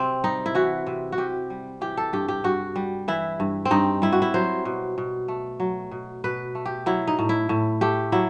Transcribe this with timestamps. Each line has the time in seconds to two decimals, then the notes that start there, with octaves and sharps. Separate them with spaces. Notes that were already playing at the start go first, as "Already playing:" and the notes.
Already playing: C3 C4
0.24 G3 D#4
0.46 E4
0.55 E3 F#4
0.87 C3
1.12 F#4
1.18 C3 G4
1.50 G3
1.81 E3 G4
1.97 A4
2.13 G2 G4
2.28 G4
2.44 G2 F#4
2.76 G3
3.08 E3 E4
3.40 G2
3.65 C4
3.71 G2 D#4
4.02 G3 E4
4.12 F#4
4.22 E4
4.34 F#3 C5
4.65 B2
4.98 B2
5.28 A3
5.60 F#3
5.91 B2
6.24 B2 B4
6.55 A3
6.66 G4
6.86 F#3 E4
7.07 D#4
7.19 A2
7.29 E4
7.49 A2
7.81 A3 G4
8.12 F#3 E4